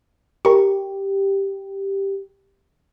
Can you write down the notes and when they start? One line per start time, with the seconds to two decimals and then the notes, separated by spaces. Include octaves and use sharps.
0.45 G4 A#4 C#6